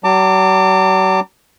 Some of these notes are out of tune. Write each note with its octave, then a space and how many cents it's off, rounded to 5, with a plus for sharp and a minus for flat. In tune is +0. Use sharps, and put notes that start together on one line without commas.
F#3 +45 A5 +45 D6 +0